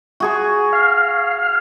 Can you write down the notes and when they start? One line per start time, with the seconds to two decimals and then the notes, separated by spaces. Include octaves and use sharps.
0.20 F#4 G#4 C#6
0.73 F5